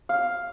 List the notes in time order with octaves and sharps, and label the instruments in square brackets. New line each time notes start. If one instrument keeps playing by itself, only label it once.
[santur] F5